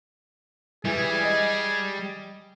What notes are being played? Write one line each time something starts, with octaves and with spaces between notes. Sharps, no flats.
E3 G3 G#4
D#5